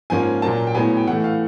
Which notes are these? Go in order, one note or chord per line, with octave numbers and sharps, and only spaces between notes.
G#2 F3 A#3 C#4 G#5
A#2 F#3 A#3 A5
G5
A2 F#3 B3 G#5
G5
A2 E3 A3 F#5
F5